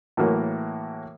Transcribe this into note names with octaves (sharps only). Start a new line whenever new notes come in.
A2 E3 F#3 A#3 F#4